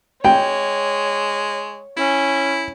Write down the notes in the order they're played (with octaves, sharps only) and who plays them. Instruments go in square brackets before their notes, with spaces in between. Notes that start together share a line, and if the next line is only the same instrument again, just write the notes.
[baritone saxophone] G#3 [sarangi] C#5 [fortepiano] G5
[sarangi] C#4 [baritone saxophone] E4